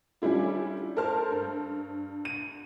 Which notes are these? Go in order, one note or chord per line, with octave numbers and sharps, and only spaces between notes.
G3 C#4 D4 E4 F4
A4 A#4 C5 A5 F6
G2
D#7